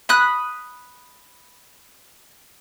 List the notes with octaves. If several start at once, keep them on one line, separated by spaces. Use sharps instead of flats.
B5 D#6 F#6